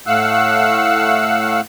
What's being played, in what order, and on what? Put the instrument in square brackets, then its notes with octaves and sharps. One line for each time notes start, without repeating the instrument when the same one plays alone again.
[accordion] A2 A3 F5 F#5 E6 F#6